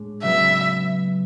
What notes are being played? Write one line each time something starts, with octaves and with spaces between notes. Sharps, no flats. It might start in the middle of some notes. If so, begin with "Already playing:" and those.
Already playing: A2 G#3 D4
C#3 F#3 B3 E5